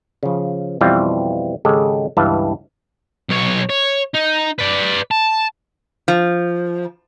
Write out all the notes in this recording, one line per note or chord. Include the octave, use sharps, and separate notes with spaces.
C#3 F3
F2 B2 E3 G3 C4 F4
G#1 C#3 G#3 G4 A4
C#2 G2 E3 F5 A5
B1 C#5
C#5
D#4
B4 D5
A5
F3